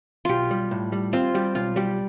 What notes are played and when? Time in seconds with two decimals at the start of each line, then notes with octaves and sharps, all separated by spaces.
0.25 B1 F4 G4
0.51 G3
0.71 A2
0.92 G3
1.13 C4 F4
1.34 G3 G4
1.55 B1 F4
1.76 G3 G4